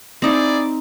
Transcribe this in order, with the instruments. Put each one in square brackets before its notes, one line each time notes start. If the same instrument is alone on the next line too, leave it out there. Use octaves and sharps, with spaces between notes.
[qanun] C4 D#4 [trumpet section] E4 G#4 D5